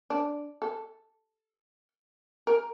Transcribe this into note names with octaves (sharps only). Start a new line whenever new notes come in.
D4
A4
A#4